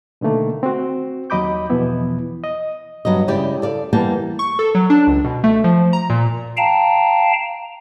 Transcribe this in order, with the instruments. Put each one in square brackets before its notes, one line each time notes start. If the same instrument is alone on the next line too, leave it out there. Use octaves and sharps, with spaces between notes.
[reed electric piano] B2 D3 D#3 A3 A#3
C4 F#4
D#2 F#3 D#5 B5 D6 G6
E2 B2 E3 F3 B3 E4
D#5
[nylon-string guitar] G2 F#3 B3 D#5
C#3 G#3 E4 G4 D5 G5
A4 D5 F5
E3 G3 A#3 B3 G5 A5
[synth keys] C#6
A4
F#3
D4
C#2
B2
A3
F3
A#5
A#2
[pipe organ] F5 G5 A5 A#5